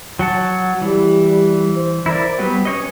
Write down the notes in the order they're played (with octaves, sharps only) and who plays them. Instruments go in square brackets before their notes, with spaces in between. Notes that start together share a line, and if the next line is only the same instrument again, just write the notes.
[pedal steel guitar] F#3 F#5 A5
[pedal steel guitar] E3 [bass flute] G3
[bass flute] C5
[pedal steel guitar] E4 A#4 D5
[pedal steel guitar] F#3 G3 B3 [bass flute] B4
[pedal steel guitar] C#4 C#5 D#5